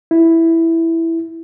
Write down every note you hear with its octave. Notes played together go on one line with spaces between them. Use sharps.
E4